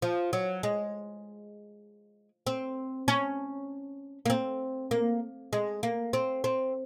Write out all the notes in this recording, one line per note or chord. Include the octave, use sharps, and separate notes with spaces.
F3
F#3
G#3
C4
C#4
A#3
C4
A#3
G#3
A#3
C4
C4